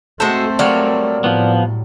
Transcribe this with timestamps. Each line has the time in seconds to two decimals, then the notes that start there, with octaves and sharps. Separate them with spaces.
0.20 G#3 A3 C4 F#4 A4 C5 E5
0.59 F#3 G3 A#3 C#5 D5
1.24 A2 F3 B3